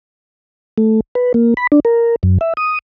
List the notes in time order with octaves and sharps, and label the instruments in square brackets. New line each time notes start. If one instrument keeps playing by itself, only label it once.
[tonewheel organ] A3
B4
A#3
B5
D4
A#4
F#2
E5
D#6